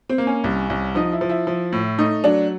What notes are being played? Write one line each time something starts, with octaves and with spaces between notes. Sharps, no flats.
C4
A#3
C#4
C2
C2
F3 D#4
E4
F3
E4
F3
A2
A3 D#4
F#3 D4